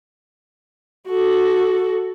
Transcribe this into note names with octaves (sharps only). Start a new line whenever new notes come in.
F#4 A4